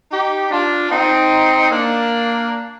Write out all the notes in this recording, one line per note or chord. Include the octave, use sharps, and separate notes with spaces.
D#4 G4
D4 F4
C4 D#4
A#3 D4